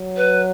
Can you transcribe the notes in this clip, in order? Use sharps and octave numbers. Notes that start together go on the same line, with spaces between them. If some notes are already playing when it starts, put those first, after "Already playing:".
Already playing: F#3
B4